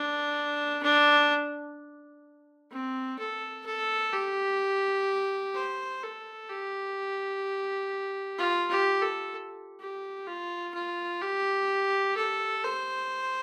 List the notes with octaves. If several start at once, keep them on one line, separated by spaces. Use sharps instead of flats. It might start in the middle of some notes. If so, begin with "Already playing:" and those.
Already playing: D4
D4
C4
A4
A4
G4
C5
A4
G4
F4
G4
A4
G4
F4
F4
G4
A4
C5